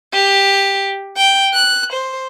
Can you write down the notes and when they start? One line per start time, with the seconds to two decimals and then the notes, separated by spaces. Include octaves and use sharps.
0.13 G4
1.17 G5
1.54 F#6
1.93 C5